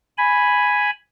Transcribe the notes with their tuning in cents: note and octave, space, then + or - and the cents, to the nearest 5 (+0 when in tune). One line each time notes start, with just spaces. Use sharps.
G#5 +0 B5 +0